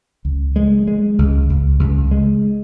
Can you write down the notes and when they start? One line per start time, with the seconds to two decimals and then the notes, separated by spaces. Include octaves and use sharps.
0.25 C#2
0.56 G#3
0.87 G#3
1.18 C#2
1.49 C#2
1.79 C#2
2.11 G#3